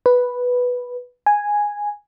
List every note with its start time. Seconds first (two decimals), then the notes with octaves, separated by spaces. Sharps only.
0.06 B4
1.26 G#5